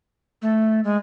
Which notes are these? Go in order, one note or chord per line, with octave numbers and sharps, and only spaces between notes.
A3
G#3